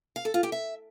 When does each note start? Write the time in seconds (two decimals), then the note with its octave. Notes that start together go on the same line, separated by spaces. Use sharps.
0.16 F5
0.25 A4
0.34 F4
0.43 G4
0.52 E5